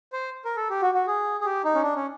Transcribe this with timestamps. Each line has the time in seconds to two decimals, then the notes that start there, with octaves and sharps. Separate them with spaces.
0.13 C5
0.45 A#4
0.57 A4
0.70 G4
0.82 F#4
0.94 F#4
1.07 G#4
1.41 G#4
1.45 G4
1.64 D#4
1.74 C#4
1.83 D4
1.95 C#4